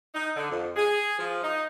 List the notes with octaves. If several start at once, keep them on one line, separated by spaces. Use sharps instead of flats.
D#4
D3
F2
G#4
F3
D#4